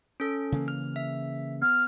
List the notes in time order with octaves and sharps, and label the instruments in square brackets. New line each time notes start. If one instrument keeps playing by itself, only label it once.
[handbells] C#4 A4
[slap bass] C#3 E3 A#3
[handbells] F6
E5
[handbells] B3 [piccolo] F6